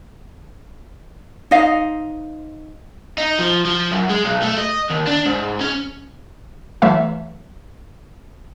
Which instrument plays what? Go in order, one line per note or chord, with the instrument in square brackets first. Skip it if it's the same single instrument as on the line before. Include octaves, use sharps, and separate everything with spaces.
[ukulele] D#4 C5 D#5 F5
[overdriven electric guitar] D#4
F3
F3
F#2
G#3
B1
A3
D#5
D#2
D4
G#2
C#4
[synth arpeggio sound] E3 F#3 A3 E5 F5